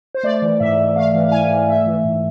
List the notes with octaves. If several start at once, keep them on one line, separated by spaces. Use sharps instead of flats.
C5
A3 D5
E3
G#2 E5
G#2
A3 F5
E3
F5
G#2 G#5
G#2
A3 E5
E3
G#2